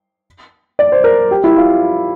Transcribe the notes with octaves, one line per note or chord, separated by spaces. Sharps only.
D5
C5
A#4
G4
E4
F4